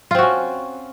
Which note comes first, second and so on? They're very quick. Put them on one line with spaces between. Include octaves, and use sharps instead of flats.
F4 C4 F#4 C#4